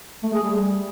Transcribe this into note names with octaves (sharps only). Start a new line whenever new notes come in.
A3
G#4
G3